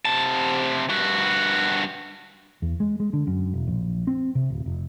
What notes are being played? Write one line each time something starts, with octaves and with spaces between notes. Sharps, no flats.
C3 A5
G2 F#4
E2
G#3
G#3
D3
F#2
E1
A#1
C4
C3
D1
F1